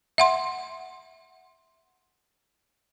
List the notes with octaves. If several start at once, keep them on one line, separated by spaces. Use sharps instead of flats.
E5 F#5 C6